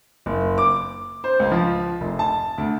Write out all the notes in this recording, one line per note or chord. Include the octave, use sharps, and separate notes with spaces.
F#1
D6
C5
C#2
F3
F1
A5
D2